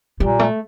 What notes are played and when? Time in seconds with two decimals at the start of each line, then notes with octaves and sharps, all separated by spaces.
0.20 A#2 G3
0.39 A3